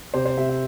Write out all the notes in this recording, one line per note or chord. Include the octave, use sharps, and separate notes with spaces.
C3 C5
C5
C3 E5
E5